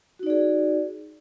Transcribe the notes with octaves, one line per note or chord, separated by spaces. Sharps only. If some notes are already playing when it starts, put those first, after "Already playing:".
D#4 F#4 G#4 D5